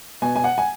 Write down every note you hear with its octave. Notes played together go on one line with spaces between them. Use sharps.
B2 G#5
G#5
F#5
G#5